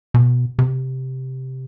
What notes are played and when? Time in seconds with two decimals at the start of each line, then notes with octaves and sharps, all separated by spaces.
0.14 B2
0.59 C3